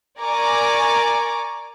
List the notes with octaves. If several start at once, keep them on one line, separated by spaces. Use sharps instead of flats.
A#4 D5 G#5 A#5 C#6 D6